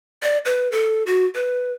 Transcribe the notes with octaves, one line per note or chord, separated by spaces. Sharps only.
D5
B4
A4
F#4
B4